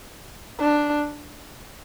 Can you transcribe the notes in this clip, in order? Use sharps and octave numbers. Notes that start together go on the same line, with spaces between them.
D4